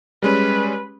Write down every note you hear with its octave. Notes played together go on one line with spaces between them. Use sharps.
G3 G#3 C#4 B4